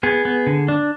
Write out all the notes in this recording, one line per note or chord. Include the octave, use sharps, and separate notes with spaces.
B3 G#4
B3
D3
D4